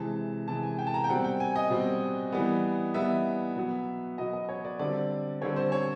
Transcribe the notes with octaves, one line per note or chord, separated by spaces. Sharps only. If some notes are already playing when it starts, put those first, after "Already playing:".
Already playing: C3 E3 G#3 A5
C3 E3 G#3 A5
G#5
G5
A5
A#5
G5
B2 G3 C4 F#5
G5
G#5
D#5
B2 G3 C4
E3 G3 B3
E3 G3 B3 E5
B2 F#3 B3
B2 F#3 B3 D#5
D#5
C#5
D5
D3 G3 C4 D5
D3 G3 C4 C#5
C5
C#5